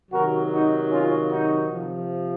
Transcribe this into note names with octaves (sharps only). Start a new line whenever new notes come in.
C3 D#3 F#3 F#4 A#4
D#4 F#4
C#4 F4
D#4 F#4
C3 F3